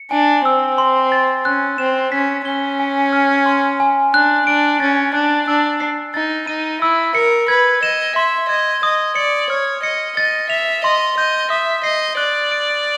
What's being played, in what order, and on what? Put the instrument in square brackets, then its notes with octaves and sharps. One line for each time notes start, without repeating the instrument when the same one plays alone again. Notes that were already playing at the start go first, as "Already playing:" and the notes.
Already playing: [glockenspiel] C#7
[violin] D4 [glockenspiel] G#5
[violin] C4 [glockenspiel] E6
[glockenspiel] C6
A6
[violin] C#4 [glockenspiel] F#6
[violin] C4 [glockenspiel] E7
[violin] C#4 [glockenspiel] B6
[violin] C#4 [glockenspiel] G7
[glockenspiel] G#5
F6
C6
G#5
[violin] D4 [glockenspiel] F#6
[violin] D4 [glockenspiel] D7
[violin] C#4 [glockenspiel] A6
[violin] D4 [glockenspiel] F#6
[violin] D4 [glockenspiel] E6
[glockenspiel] C7
[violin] D#4 [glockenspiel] A6
[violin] D#4 [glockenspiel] D#7
[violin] E4 [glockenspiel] E6
[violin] A#4 [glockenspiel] C#7
[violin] B4 [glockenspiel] G#6
[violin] D#5 [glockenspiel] E7
[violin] E5 [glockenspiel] C6
[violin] D#5 [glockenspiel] G#6
[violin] D#5 [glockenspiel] D#6
[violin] D5 [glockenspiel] C#7
[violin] C#5 [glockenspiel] F6
[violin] D#5 [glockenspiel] C#7
[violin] D#5 [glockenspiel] A6
[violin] E5 [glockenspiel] F7
[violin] D#5 [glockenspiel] C6
[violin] D#5 [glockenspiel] G6
[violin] E5 [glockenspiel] D#6
[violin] D#5 [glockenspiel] C7
[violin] D5 [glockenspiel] F#6
[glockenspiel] D7